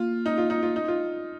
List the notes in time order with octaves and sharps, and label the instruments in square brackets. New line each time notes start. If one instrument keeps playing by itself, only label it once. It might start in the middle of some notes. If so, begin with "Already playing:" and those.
Already playing: [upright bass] A#3 [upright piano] F4
[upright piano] D#4
F4
D#4
F4
D#4
F4